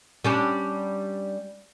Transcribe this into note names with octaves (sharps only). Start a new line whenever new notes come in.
G3 C#4 D4